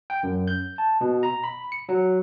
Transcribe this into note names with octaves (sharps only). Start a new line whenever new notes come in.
G5
F#2
G6
A5
B2
A#5
B5
C#7
F#3